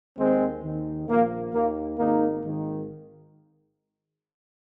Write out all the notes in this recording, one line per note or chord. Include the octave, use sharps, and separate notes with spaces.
D#2 D#3 G#3 C4
D#2 D#3
A#1 A#2 F3 A#3
D#2 D#3 A#3
G#1 G#2 D#3 A#3 D#4
G#1 G#2 D#3